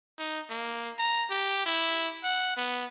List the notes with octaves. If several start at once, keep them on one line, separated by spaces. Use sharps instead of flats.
D#4
A#3
A#5
G4
E4
F#5
B3